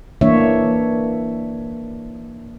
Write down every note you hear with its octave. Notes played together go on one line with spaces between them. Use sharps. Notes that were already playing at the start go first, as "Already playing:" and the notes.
E3 A#3 D4 C#5 E5